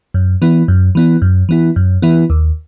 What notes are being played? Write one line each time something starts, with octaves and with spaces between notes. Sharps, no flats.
F#2
E3 B3 E4
F#2
E3 B3 E4
F#2
E3 B3 E4
F#2
E3 B3 E4
D#2